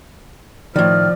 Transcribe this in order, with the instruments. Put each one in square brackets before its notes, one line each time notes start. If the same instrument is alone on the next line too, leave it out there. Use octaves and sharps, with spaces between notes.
[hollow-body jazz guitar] A2 D#3 [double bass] F3 [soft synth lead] D5 [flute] F6